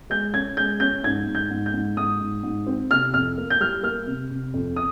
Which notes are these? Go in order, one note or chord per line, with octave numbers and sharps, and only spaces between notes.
G#3 G6
C#4 G#6
G#3 G6
C#4 G6
G#2 G#6
G#2
G6
G#2
G6
G#2
G#2 D#6
G#2
G#2
C4
C3 F6
F2 F6
A#3
G6
G3 F6
A#3 F6
C3
C3
F2
D#6